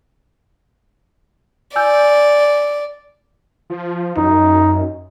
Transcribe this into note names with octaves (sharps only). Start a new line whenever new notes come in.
D5 G#5 E6 G6
F3
F#2 D#4